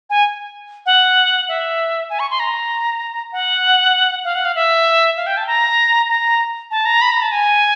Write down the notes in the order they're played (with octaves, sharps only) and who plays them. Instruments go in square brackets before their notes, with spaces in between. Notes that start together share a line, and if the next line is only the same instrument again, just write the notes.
[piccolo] G#5
F#5
E5
G#5
C#6
C6
A#5
F#5
F5
F#5
F5
E5
F5
G5
A5
A#5
A#5
A5
A#5
B5
A#5
A5
G#5